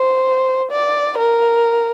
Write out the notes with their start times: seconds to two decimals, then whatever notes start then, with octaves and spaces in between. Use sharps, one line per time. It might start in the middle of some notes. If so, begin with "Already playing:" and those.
Already playing: C5
0.71 D5
1.18 A#4